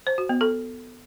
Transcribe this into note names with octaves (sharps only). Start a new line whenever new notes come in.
C5
F#4
B3
A4